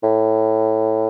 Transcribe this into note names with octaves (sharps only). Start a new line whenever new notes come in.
A2